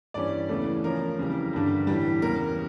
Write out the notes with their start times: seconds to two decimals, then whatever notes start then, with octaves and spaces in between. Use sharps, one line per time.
0.14 G2 E3 G3 C#4 D5
0.49 E2 C#3 E3 A3
0.83 C#3 F3 C#4 A#4
1.18 F2 C#3 E3 G3
1.53 G2 D3 G3
1.87 A2 E3 G3
2.22 E2 C#3 G3 A#4